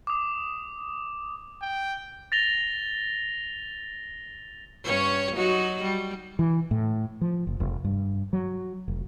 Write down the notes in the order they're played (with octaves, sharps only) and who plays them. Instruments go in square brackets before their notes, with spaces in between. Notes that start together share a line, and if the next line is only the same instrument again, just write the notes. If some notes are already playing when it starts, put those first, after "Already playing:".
[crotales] D6 D#6
[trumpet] G5
[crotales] A6 A#6 F7 G7
[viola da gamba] G2 C#4 C#5
F#3 D#4 F#4
G3
[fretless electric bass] E3
A2
F3
F#1
F1
G2
F#3
F1